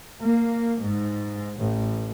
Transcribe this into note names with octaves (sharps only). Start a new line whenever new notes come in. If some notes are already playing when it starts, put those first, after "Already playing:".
A#3
G#2
A1